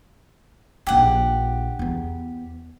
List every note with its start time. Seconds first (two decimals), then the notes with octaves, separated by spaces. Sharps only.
0.87 A#1 C#4 G4 F#5
1.79 E2 B3